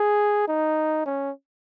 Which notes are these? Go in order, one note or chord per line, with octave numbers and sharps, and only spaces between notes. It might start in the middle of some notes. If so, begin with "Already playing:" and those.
Already playing: G#4
D#4
C#4